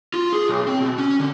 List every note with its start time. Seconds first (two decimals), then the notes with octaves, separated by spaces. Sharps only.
0.14 F4
0.33 G#4
0.48 B1
0.67 C4
0.80 B2
0.98 C#4
1.20 D3